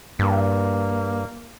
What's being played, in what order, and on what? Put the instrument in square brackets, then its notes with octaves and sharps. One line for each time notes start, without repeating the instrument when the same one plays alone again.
[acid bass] G2 [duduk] A#3